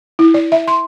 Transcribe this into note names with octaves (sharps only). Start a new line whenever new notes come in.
E4
D5
E5
C6